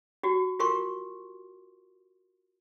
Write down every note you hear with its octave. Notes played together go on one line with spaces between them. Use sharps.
F#4 G4
F4 G4 A#4 C6 C#6